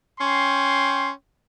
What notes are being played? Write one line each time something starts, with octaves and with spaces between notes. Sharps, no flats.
C#4 G5 C6